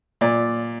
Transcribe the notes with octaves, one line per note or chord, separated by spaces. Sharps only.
A#2 D5